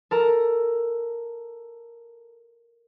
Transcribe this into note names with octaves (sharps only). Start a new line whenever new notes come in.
A4 A#4 A#5